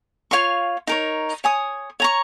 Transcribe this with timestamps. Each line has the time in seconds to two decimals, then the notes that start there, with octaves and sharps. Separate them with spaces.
0.31 F4 C#5 F5 C#6
0.87 D#4 A#4 C#5
1.44 C#5 G#5 D#6
2.00 C#5 A#5 C#6